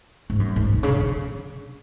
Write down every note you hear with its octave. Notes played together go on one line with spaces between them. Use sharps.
G#2
F#2
G#2
B2
C#3
D3